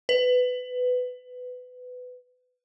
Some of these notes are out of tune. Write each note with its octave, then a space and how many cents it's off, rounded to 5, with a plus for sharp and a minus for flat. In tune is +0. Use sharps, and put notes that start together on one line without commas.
B4 +20